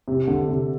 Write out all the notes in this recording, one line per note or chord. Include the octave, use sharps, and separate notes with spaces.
C3
D3
C3